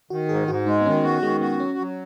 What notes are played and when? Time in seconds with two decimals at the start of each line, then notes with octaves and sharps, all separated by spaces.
0.10 D#3 F#4
0.29 G#2 G#4
0.48 G#2 F#4
0.66 G#3 D#4
0.81 B3
0.86 D#3 C#4
1.03 B3 F#4
1.22 D#3 G#3
1.41 B3 F#4
1.59 F#3 C#4
1.78 F#3